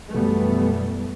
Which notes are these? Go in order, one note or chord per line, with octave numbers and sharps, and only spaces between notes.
F#2 B2 E3 G3 A3 B3